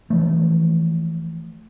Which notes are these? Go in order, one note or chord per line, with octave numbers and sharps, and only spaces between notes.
E3 F3 A3